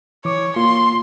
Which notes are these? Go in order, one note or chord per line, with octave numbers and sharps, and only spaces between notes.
E3 C#5 D6
A#3 F4 C6